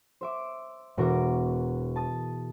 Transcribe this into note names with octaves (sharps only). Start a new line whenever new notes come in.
C5 E5 D6
E1 B2 F#4 A#4 D6 A#6
A5 D#6 A6